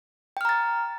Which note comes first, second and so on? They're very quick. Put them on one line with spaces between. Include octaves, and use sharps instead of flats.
G5 F6 A#5 A6